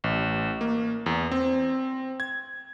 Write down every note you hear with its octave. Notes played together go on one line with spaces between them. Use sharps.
A1
A#3
E2
C4
G#6